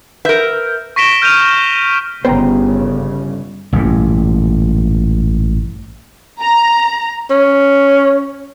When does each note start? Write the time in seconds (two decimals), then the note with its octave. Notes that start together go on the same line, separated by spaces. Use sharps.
0.25 A#4 B4 E5 G6
0.96 C#6 A#6 B6 D7 E7 G7
1.22 F6 G6 D#7 F7
2.25 G1 C#3 B3 C5 G5 A#5
3.73 A1 G2 A#2
6.40 A#5
7.31 C#4